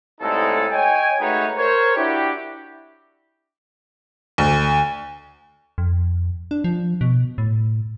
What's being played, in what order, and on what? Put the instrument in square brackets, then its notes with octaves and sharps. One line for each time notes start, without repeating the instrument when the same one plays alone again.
[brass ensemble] C2 A2 G#3 D#4 A4
C#5 D#5 G5 G#5
G#3 A3 D#4 F#4 B4 C#5
A#4 C5 C#5
D4 E4 F#4 G4
[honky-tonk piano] D2
[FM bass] F2
D4
F3
B2
A2